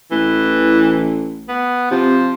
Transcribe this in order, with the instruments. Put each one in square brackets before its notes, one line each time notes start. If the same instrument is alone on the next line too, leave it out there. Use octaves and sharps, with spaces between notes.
[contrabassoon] A1 [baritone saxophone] E3
[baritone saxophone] B3
[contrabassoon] C3 [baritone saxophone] F3